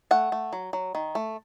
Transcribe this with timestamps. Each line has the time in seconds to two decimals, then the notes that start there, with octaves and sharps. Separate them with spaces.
0.11 A3 F#5
0.32 A3
0.53 F#3
0.73 F#3
0.95 D#3
1.15 A3